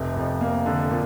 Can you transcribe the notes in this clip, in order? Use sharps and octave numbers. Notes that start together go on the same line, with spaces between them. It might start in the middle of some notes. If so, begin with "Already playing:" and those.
Already playing: F1 C3
F2
A#3
D3
A#2